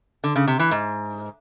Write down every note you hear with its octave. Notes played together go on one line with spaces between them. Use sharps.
D3
C#3
C3
E3
G#2